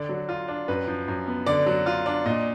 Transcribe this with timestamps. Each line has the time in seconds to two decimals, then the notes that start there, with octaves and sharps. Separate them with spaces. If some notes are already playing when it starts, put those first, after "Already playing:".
Already playing: D3 D5
0.09 F#3
0.29 F4
0.48 D4
0.68 F#2 B4
0.88 F3
1.08 F#2
1.27 B3
1.46 D3 D5
1.66 F#3
1.86 F4
2.06 D4
2.25 A#2 D#5